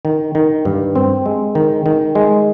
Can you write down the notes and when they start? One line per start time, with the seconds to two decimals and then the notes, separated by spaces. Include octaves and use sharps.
0.05 D#3
0.35 D#3
0.65 G2
0.95 C4
1.26 G#3
1.55 D#3
1.86 D#3
2.15 G#3